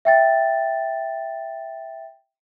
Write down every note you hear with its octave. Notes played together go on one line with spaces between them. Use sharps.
E5 G5 A6